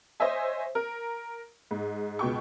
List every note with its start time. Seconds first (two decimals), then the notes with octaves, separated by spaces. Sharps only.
0.20 C5 C#5 D#5 E5 G#5
0.75 A#4
1.71 G#2
2.19 C#2 B2 G5 C#6